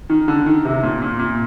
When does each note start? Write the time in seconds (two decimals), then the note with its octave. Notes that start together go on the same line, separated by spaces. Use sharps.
0.10 D#3
0.28 D3
0.46 D#3
0.65 C3
0.83 A#2
1.02 A#2
1.19 A#2